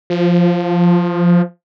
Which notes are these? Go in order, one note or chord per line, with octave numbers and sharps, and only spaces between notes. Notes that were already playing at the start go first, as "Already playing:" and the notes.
F3